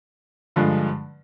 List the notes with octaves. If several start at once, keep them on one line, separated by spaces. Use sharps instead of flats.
G2 D3 F3 G#3